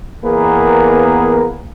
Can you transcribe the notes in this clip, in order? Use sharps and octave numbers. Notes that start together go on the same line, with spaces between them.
E2 A#3 B3 G#4 A#4 B4